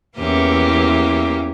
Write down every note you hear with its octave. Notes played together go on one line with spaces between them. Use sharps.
E2 E3 A#3 C#4 G4